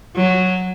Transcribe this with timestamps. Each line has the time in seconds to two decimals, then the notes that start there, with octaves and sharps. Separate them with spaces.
0.16 F#3